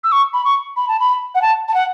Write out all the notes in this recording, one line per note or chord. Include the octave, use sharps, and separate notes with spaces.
E6
C#6
B5
C#6
B5
A5
B5
F#5
A5
A5
F#5